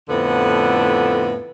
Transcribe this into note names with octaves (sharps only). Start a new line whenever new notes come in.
F2 A2 D3 B3